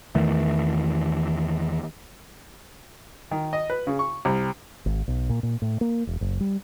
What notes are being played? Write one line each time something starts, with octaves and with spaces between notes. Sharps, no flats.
E2 D#3 E3 A3
D#3
D#5
B4
C#3
C#6
C2
G#1
B1
A#2
A#2
A2
A#3
E1
F#1
G3